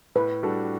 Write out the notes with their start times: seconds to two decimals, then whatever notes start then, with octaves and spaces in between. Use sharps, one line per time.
0.15 A2 B4
0.43 G3 D4 F#4 A4